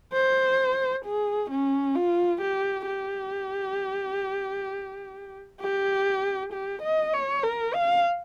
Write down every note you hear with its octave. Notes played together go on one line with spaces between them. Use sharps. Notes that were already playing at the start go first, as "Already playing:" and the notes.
C5
G#4
C#4
F4
G4
G4
G4
G4
D#5
C#5
A#4
F5